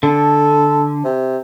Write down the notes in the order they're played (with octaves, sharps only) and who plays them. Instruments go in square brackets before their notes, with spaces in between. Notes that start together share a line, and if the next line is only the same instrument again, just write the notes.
[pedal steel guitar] D3 [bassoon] A4
[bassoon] C3